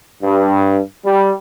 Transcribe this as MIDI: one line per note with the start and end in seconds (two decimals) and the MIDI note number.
0.22 0.79 43
1.05 1.31 55